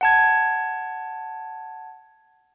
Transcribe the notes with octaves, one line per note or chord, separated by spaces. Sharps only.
F#5 A5 G#6